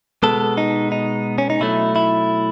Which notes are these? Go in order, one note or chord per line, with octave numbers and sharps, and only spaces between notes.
B2 G#3 B3 A4
D#4
D#4
C#4
D#4
B2 F#3 A3 E4
E4